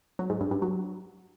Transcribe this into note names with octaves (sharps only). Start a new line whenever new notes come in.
F#3
G#2
G2
G2
F#3